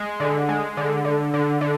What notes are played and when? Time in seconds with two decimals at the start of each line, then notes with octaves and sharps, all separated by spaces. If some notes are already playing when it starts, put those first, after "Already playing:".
Already playing: G#3
0.20 D3
0.49 G#3
0.77 D3
1.05 D3
1.34 D3
1.61 D3